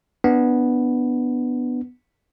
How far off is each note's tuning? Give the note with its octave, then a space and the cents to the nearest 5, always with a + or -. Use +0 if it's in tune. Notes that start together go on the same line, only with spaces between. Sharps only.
B3 +0 D4 +5